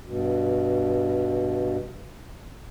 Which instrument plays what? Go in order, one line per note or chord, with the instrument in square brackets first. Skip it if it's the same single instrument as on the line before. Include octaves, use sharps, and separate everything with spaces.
[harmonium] G2 B2